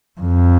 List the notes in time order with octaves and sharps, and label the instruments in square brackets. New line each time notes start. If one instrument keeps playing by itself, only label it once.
[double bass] F2